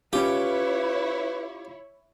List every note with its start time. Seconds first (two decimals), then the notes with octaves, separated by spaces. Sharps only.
0.13 C#4 E4 F4 G4 B4 C#5